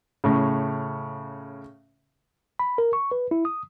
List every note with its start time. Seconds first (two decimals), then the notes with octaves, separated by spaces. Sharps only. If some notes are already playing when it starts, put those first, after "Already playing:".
0.24 A2 C#3
2.59 B5
2.78 A#4
2.93 C#6
3.11 B4
3.31 E4
3.45 D#6